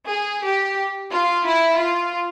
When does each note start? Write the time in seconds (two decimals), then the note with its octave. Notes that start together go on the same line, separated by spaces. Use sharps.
0.08 G#4
0.43 G4
1.10 F4
1.45 E4
1.79 F4